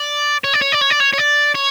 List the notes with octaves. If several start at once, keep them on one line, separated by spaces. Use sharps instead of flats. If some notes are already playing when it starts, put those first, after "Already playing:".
Already playing: D5
C#5
D5
C#5
D5
C#5
D5
C#5
C#5
D5
C#5